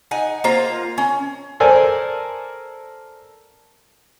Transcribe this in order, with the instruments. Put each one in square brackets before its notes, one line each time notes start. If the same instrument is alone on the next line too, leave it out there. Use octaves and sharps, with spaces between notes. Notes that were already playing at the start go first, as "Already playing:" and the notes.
[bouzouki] D#4 F#5 G#5
A#3 F4 C5 A#5
C#4
[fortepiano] A4 A#4 C5 D5 G#5